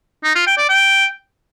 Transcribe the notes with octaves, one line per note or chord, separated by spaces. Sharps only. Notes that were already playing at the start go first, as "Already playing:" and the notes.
D#4
F4
G5
D5
G5